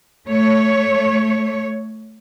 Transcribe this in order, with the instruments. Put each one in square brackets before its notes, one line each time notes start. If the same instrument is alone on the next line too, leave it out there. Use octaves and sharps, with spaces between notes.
[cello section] A3 C#5